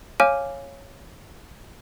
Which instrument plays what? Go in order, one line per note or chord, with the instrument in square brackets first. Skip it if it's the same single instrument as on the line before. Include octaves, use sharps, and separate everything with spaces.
[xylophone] C#5 F5 G#5 D6 F6 D#7